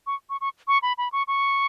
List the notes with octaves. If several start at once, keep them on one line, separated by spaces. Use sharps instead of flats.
C#6
C#6
C#6
C#6
B5
B5
C#6
C#6